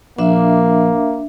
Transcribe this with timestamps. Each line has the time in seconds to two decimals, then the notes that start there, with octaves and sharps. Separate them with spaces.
0.19 A#1 A#3 D4 E5